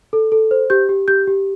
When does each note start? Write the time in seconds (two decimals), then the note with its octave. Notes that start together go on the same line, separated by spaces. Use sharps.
0.13 A4
0.32 A4
0.51 C5
0.70 G4 G6
0.89 G4
1.08 G4 G6
1.27 G4